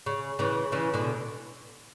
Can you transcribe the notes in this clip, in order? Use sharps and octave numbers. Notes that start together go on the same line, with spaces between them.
C#3
C#3 E3
C#3 E3
B2 D3